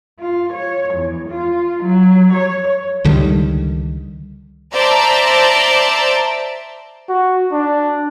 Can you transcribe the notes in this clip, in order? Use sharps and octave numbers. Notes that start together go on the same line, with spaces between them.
F4
C#5
E2
F4
F#3
C#5
C#2 D3 D#3 G3
C5 D5 E5 A5 A#5
F#4
D4